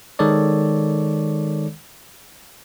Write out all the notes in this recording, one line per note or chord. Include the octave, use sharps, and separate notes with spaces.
D#3 G#3 A4 C#5 D5